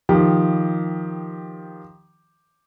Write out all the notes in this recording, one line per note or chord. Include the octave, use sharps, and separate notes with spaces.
D#3 F3 G4